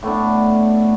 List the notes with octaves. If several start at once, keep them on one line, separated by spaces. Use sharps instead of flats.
A2 A3 B3 D4